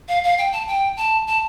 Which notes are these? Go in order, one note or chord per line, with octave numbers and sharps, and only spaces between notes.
F5
F5
G5
A5
G5
A5
A5